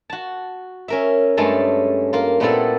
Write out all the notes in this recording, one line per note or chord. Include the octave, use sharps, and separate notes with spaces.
F#4 A5
C#4 A#4 E5
G2 G#3 A3 C#4 A5
A#3 F4
A#2 A3 B3 C4 E4 A4